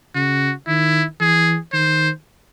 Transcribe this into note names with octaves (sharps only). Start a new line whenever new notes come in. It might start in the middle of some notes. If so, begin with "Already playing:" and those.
C#3 F#4
D#3 E4
E3 G#4
D#3 C5